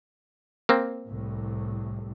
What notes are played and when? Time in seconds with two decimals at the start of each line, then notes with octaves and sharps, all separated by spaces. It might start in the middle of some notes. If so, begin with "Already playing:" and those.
0.69 A#3 C4
1.07 C2 A2